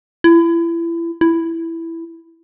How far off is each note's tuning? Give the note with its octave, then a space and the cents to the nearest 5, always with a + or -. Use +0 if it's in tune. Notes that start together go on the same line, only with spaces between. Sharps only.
E4 +30
E4 +5